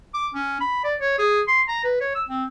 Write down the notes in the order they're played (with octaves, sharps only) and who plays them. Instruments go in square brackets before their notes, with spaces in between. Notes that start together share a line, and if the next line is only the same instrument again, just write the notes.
[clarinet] D6
C#4
B5
D5
C#5
G#4
C6
A#5
B4
C#5
E6
C4